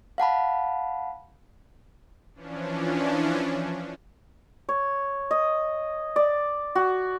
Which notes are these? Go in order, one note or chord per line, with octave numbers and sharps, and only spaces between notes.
F5 F#5 A5 B5
E3 F3 C#4 D4
C#5
D#5
D5
F#4